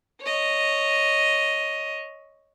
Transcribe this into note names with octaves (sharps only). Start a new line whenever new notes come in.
C#5 D#5